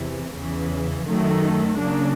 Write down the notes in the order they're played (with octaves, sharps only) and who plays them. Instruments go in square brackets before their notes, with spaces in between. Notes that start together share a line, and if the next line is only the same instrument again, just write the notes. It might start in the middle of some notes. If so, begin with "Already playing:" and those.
Already playing: [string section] E2 C3 E3
E2 C#3 E3
F#2 D#3 F#3 A3
C#3 F#3 A#3 D4